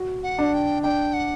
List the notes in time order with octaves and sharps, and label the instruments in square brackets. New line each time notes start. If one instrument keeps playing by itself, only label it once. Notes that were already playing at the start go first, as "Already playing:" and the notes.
Already playing: [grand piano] F#4
[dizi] F#5
[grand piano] D4
[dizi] G5
[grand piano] D4 [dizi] G5
[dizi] F#5